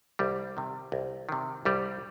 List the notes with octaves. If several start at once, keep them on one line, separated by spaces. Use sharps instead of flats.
C2 G3
C3 D#3
C2
C3 D#3
C2 G3